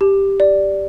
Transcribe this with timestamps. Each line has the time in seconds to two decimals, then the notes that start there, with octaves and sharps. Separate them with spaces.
0.01 G4
0.40 D5